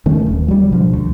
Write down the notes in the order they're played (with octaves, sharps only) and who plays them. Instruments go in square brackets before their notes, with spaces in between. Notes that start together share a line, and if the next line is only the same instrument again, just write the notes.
[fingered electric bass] D#3 A3 C#4
D#1
F#3 G3
A1 B2 D3 F3
D2